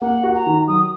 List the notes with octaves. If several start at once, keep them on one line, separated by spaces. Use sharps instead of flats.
A#3 F#5
F#4
A#5
D#3
F#3 D#6